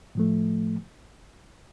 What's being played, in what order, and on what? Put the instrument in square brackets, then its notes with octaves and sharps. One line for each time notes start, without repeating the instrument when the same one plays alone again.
[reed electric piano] A2 F3 A3